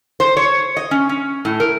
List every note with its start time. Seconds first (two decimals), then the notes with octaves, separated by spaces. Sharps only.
0.20 C5
0.37 C#5
0.77 D#5
0.91 C#4
1.09 C#4
1.45 A2
1.60 A#4